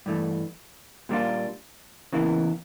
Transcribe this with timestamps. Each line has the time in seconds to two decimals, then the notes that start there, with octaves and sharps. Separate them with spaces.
0.06 G2 E3 A3
1.09 A#2 G3 A#3 D4 F4
2.13 E2 C#3 E3 A#3 E4